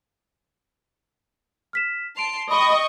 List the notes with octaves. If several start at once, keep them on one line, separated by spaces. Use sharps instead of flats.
F6 B6 E7
A5 C6 C7 D7 F7
D#5 G5 B5 C#6 D#6